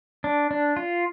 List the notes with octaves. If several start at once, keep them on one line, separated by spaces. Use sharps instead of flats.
D4
D4
F4